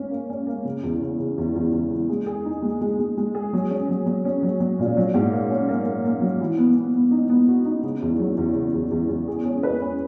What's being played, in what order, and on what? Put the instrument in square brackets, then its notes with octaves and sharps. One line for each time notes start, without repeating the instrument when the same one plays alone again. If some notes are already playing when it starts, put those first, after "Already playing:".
Already playing: [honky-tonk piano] A#3 C#4
A#3
C#4
A#3
C#3
E2
C#3
C#3
E2
E2
E2
E3
G#3
G#4
D#4
G#3
G#3
G#3
G#3
G#4
F#3
C#4
F#3
F#3
C#4
F#3
F#3
A#2
F#3
G#2
A#3
C#4
A#3
A#3
A#3
F#3
E3
B3
B3
B3
D#4
B3
F#4
D#4
C#3
E2
F#3
E2
C#3
E2
E2
E2
G#4
C#4
B4
C#4